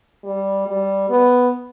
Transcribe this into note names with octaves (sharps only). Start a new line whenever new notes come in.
G3
G3
B3